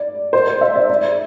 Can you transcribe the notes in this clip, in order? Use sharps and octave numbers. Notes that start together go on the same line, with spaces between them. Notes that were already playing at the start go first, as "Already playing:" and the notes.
Already playing: D5
C5
C5
E5
D5
D5